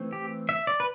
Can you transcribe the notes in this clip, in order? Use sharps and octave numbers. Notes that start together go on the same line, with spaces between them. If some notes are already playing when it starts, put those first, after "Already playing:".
Already playing: E3 A3 C4
G4
E5
D5
B4